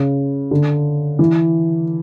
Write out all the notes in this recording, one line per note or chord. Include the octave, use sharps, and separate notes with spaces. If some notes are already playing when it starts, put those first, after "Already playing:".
Already playing: C#3
D3
E3